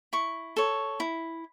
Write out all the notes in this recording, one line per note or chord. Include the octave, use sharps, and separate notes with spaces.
E4 C#6
A4 C#5
E4